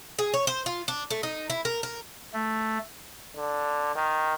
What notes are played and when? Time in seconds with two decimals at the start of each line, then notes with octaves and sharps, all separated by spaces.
0.19 G#4
0.34 C#5
0.47 C5
0.66 F4
0.88 D4
1.10 A3
1.23 D#4
1.50 E4
1.65 A#4
1.83 A#4
2.34 A3
3.37 D3
3.96 D#3